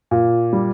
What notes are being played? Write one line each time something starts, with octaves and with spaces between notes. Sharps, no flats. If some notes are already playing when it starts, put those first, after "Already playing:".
A#2
G3